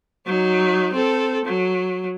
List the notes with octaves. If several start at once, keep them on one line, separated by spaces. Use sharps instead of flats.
F#3 D#4
C4 A4
F#3